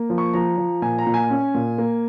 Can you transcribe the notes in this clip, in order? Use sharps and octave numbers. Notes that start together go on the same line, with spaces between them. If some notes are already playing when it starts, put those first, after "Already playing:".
Already playing: A#3
F3
C#6
F3 A#5
F3
A#2 G#5
A#5
A#2
G#5
C#4
A#2
A#3